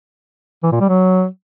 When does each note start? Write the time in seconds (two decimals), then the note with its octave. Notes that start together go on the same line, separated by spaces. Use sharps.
0.63 E3
0.72 A#2
0.80 G3
0.89 F#3